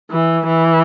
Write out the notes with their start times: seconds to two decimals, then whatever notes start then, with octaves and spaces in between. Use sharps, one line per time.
0.11 E3
0.48 E3